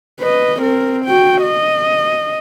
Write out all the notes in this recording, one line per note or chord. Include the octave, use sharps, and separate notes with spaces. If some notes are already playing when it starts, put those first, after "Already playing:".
B4 D#5
C4 A#4
F#4 G5
D#5